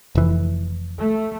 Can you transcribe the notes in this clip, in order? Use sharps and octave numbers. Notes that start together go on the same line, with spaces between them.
F1 E3
A3